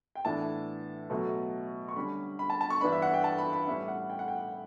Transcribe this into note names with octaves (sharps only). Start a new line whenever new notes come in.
G5
A2 E3 B3 D4 A5
B2 F#3 A3
C#6
D3 G3 C#4 B5
B5
A5
A5
C#6
G2 E3 B3 D4 B5
E5
F#5
G5
A5
B5
B5
A2 G3 C#4 E5
F#5
G5
F#5
G5